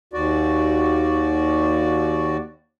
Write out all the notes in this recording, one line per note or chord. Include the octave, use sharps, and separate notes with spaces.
D#2 F#4 D5